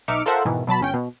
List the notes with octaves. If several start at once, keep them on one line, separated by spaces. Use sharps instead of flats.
B1 D#4 E5 D6 F6 C#7
F4 A4 A#4 C5 E5 F#5
G#2 B2 D#3 E3
B2 F#3 A5 B5
G1 C#4 G5
B2